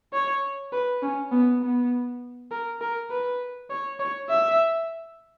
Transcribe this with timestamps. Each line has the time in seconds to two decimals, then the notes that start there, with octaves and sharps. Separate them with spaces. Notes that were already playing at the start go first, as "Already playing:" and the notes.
0.13 C#5
0.72 B4
1.02 C#4
1.31 B3
1.62 B3
2.51 A#4
2.81 A#4
3.11 B4
3.70 C#5
4.00 C#5
4.30 E5